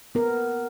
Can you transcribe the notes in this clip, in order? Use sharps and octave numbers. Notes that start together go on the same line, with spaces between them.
B3 A#4